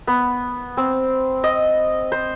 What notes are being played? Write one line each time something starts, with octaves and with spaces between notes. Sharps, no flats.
B3
C4
D#5
C5